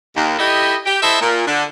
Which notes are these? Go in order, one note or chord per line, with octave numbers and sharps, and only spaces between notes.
D#2
E4 G4 A4 D#5
G4
E4 A4 C5 D#5 E5
A#2
D3